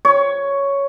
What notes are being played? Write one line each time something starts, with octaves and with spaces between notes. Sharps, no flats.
C#5